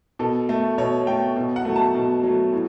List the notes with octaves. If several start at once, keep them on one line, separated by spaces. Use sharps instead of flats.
B2 A4
A3
B2 C#5
A3 G5
B2
F#5
F#3 A3
A5
B2
F#3 A3
A2